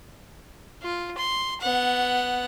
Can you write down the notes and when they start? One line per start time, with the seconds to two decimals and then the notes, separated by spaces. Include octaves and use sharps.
0.82 F4
1.18 C6
1.61 B3 F#5